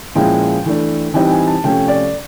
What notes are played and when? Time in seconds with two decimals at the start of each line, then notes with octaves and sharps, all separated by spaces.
0.15 A#2 F3 G#3 C#4 E4 G5
0.65 E3 A3 D4
1.14 E3 G3 C4 D#4 G5
1.26 G5
1.31 G#5
1.47 A5
1.64 C3 F3 A3 C#4 G5
1.88 D5